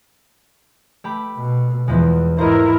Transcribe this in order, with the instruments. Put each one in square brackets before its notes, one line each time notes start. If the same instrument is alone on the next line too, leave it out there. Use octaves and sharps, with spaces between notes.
[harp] A3 G4 B5
[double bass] B2
[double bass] E2 [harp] E3 F3 G#3
[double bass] G#2 [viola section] E4 A#4 [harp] C5 D#5